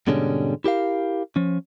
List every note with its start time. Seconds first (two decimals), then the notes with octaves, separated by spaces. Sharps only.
0.07 G#2 B2 D3 G3 G#3 C#4
0.64 E4 G4 A#4 F5
1.36 F3 C#4